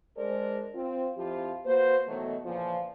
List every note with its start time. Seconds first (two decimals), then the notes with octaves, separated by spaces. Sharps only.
0.17 G#3 D4 G#4 A#4 C5 D5
0.75 C4 F4
1.17 F2 F3 E4 F4 G4
1.65 A#3 F#4 B4 C5
2.06 B2 D#3 E3 F#3 A3
2.44 A#2 C#3 E3 F3